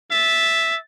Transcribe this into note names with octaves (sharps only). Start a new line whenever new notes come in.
E5 A6